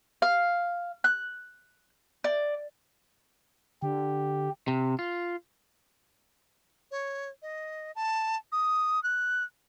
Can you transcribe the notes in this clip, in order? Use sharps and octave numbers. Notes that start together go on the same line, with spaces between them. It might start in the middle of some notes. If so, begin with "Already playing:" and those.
F5
F#6
D5
D3 G4
C3
F4
C#5
D#5
A5
D#6
F#6